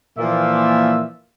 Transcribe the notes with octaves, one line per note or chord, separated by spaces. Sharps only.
A#2 E3 F3 A#3 F4 E5